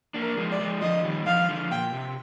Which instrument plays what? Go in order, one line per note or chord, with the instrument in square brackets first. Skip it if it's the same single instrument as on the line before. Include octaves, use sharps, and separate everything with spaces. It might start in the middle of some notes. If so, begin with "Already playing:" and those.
[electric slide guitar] A#3 D4
[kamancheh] A#4
[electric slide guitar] F3 G#3
[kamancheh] D5
[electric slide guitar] F3 G#3
[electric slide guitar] D3 F3 [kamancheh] D#5
[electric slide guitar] D#3 G3
[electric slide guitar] D3 F3 [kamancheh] F5
[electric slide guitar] D3 F3
[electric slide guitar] A#2 [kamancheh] G5
[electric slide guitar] C3